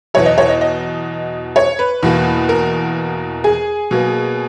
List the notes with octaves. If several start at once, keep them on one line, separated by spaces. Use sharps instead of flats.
E2 B2 F#3 C#5
D#5
C#5
D#5
D#5
C#5
B4
E2 B2 A#3
A#4
G#4
B2 F#3 A#3